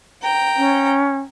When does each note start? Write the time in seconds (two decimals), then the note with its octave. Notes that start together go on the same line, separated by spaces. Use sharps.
0.23 G5 A#5
0.57 C#4